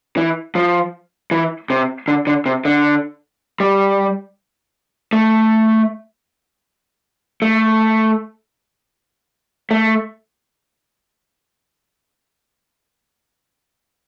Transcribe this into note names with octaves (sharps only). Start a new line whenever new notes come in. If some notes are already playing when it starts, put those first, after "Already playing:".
E3
F3
E3
C3
D3
D3
C3
D3
G3
A3
A3
A3